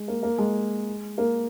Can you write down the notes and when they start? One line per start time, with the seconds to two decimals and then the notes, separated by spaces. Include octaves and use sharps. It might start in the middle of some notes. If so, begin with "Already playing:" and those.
Already playing: G#3
0.08 A#3
0.23 A#3
0.38 G#3
1.18 A#3